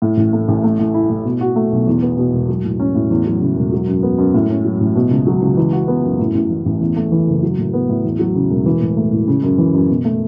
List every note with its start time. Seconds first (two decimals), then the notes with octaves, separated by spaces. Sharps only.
0.02 A2
0.17 A1
0.33 A3
0.48 A1
0.64 A3
0.79 A2
0.94 E4
1.10 A2
1.25 B2
1.41 F#4
1.56 A3
1.72 B1
1.87 E2
2.02 B3
2.17 B2
2.33 E1
2.49 F#3
2.64 A2
2.80 C#4
2.95 A2
3.10 E2
3.26 F#3
3.41 C#3
3.56 E1
3.72 F#3
3.87 F#2
4.03 B3
4.18 F#2
4.34 A2
4.50 C#4
4.65 F#3
4.80 A1
4.96 B2
5.11 C#2
5.27 F#3
5.42 C#2
5.57 E3
5.72 F#4
5.88 B3
6.04 F#2
6.19 A2
6.35 A1
6.50 E3
6.65 A1
6.81 E2
6.97 A3
7.12 E3
7.27 F#1
7.43 F#3
7.58 A2
7.73 B3
7.89 A2
8.04 E2
8.19 F#3
8.35 C#3
8.50 E1
8.66 E3
8.81 A2
8.97 A3
9.12 A2
9.27 C#3
9.43 F#2
9.58 E3
9.74 F#2
9.89 B2
10.05 A3